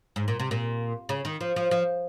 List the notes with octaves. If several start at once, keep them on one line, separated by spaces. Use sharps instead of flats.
G#2
A#2
C3
A#2
C#3
D#3
F3
F3
F3